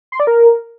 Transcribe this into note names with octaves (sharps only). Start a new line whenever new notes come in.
C6
D5
A#4